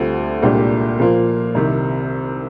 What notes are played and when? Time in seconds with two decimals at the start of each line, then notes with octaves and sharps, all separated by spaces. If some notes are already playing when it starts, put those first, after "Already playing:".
Already playing: D2 D3 G3 C4 F4
0.42 C2 A#2 G#3 D4 G4
0.99 A#2 F3 A#3 F4
1.55 C2 C3 D#3